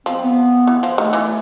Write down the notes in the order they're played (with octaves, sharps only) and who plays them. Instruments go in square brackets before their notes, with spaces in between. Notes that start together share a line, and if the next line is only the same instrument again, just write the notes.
[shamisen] F3 [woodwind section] C4
[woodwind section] B3
[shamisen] E3
F3
[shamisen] D#3 [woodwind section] A3
[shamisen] E3